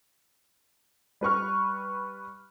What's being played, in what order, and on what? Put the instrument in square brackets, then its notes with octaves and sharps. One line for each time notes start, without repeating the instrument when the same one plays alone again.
[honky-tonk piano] G3 B4 C#6 F6